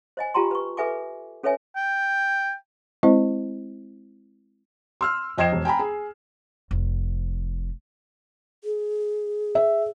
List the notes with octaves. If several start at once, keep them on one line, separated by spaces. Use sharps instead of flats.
C5 D#5 G#5
F4 G4 G5 A5 A#5 C6
B4 C#6
A4 B4 E5 G#5 D6
C#4 A4 B4 C#5 E5 G#5
G5
G#3 C4 E4 C5 D#5
C6 E6 F6
F2 D#5 G5 G#6 C7 E7
E1
G5 G#5 A#5 B5
G#4
F1 F3
G#4
E5